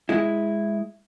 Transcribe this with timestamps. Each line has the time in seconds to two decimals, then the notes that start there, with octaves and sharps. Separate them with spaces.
0.09 G#3 E4